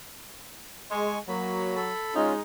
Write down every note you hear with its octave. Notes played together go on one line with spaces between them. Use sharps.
G#3 G#5 C#6
F#3 A#3 B5
A4 B5
G#3 C#4 D#4 F4